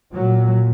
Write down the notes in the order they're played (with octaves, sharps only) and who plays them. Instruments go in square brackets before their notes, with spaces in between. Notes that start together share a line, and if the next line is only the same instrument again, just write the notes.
[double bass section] A#2 F#3